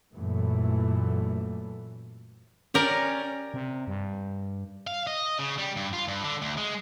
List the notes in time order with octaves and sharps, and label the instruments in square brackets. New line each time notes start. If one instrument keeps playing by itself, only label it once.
[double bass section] F#2 A#2 E3 A3
[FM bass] C#4 [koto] G4 A#4 D5
[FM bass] C3
G2
[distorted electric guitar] F5
D#5
C#3
G3
G2
F4
G2
D3
D2
G#3